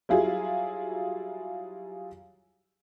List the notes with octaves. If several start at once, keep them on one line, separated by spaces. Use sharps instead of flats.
F#3 G3 E4 F4 G#4